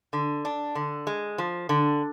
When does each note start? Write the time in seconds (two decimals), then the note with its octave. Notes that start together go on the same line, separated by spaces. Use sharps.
0.13 D3
0.45 D4
0.75 D3
1.07 G#3
1.38 F3
1.69 D3